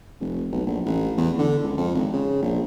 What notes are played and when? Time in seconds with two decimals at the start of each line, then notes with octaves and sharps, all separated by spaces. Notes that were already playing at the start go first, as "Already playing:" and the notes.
0.20 F1
0.52 B1
0.66 A#1
0.86 A1
1.17 E2
1.39 D3
1.63 C#2
1.77 F2
1.95 G#1
2.13 C#3
2.42 A#1